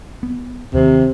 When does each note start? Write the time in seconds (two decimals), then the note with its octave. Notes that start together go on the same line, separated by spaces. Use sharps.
0.23 B3
0.74 D#2 C3 D#3